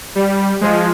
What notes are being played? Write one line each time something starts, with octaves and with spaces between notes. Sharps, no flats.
G3
F3 G#3